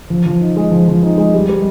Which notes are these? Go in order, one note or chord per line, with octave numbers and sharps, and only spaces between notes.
F3
F3
D#4
G#3
F3
F3
D#4
G#3
G3
G3